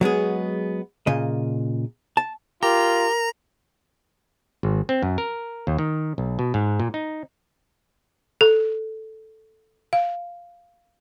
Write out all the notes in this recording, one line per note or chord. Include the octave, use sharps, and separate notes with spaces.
F#3 G#3 B3 G#4
A#2 C#3 D#5
A5
F4 G4 A#4 A#5
G#1
C4
F#2
A#4
D#2
D#3
B1
B2
G#2
A#2
D#4
A4
F5